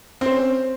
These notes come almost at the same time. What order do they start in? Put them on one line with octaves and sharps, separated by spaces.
C4 C5 C#4